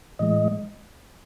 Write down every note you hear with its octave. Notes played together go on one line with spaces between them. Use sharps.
A2 E3 G#3 D#5